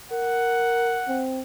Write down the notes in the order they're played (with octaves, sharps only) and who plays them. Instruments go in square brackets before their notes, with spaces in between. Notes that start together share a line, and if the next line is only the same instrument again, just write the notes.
[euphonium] A#4 [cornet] F#5
[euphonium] C4